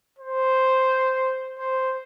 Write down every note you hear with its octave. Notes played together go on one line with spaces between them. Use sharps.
C5
C5